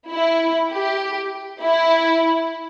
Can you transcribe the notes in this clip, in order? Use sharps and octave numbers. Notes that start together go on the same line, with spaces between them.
E4
G4
E4